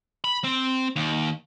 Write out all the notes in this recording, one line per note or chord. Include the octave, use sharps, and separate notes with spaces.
B5
C4
D#2